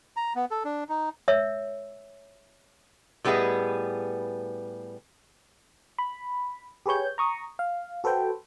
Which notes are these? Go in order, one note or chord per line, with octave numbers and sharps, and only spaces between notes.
A#5
B3
A4
D4
D#4
C#5 E5 E6
A2 G3 B3 G#4 B4 D#5
B5
G4 G#4 B4 C#5 G6
A#5 C#6 D#6
F5
F#4 A4 B4 C5 G5